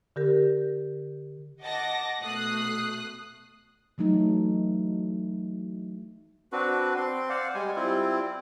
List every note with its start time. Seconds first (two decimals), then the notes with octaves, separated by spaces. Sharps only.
0.16 D3 G4 A#4
1.61 D#5 F#5 A5 D6 A6 A#6
2.21 B2 A3 D#6 F#6 C7
3.98 E3 F#3 A3 D#4
6.52 C4 D4 F#4 B4
6.97 C4 C6
7.30 C5 D5 F5 F#5
7.54 G3 G#3 G#5
7.76 G3 C4 E4 F4